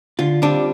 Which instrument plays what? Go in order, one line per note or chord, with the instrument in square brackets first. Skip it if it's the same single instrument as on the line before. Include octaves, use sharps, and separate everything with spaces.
[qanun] D3 [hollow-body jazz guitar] F4
[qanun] G3 C4 F4 [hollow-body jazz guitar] D4